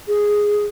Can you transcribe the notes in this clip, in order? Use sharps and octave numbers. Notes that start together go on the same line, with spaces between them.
G#4